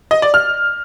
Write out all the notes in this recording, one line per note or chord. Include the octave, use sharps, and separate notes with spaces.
D#5
D5
F6